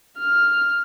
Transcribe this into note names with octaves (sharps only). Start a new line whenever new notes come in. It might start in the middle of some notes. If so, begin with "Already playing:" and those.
F6